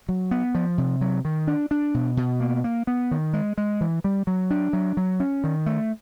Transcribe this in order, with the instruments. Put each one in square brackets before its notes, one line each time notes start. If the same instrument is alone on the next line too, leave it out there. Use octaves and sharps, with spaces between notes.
[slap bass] F#3
B3
F3
C3
F#3
D#3
D4
D4
B2
B2
A#3
A#3
B3
D#3
G#3
G#3
E3
G3
F#3
D4
F#3
F#3
C#4
D#3
A3